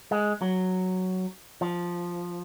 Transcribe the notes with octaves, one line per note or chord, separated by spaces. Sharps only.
G#3
F#3
F3